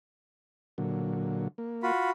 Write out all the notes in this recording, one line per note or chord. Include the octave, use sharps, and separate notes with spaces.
A#2 D3 F#3
A#3
F4 F#4 B5